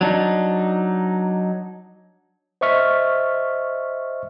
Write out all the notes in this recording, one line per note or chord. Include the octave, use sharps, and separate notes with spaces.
F#3 D4 D#4
C5 D#5 E5 C#6 F6 B6